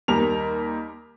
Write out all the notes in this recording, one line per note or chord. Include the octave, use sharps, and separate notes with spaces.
D#2 G3 A#4 F7